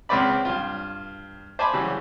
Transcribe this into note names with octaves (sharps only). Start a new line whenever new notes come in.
C#2 C#3 C4 B4 D5 B5
G2 F4
C5 D5 G#5 A5 B5 D6
C#3 E3 F#3 G3